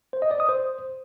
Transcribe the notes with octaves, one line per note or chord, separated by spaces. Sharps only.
C5
D#5
D5
D#6
C5